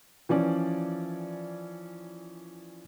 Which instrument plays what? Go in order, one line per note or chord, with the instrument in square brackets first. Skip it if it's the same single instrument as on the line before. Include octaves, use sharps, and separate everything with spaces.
[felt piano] E3 F3 C#4 D5